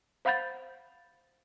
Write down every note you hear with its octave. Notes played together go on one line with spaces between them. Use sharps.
C5 F5 F#5 B5 G6 A6